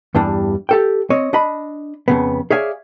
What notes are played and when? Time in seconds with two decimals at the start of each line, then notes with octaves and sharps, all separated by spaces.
0.15 E2 G2 E3 G3 D4
0.69 G4 A4 G5
1.10 C4 C#5 D#5
1.33 D4 D#5 B5
2.08 F2 C#3 B3
2.50 G#4 C#5 D5 E5 F5 G#5